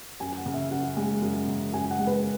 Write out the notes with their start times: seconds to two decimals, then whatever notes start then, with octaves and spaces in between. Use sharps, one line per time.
0.20 F#2 G#5
0.37 F#5
0.46 C#3
0.54 E5
0.71 F#2 F#5
0.97 G#3
1.22 F#2
1.48 C#3
1.73 F#2 G#5
1.90 F#5
1.99 G#3
2.07 B4